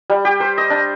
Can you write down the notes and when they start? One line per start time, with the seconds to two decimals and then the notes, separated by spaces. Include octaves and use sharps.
0.10 G3
0.25 G4
0.40 C5
0.58 D#5
0.70 D4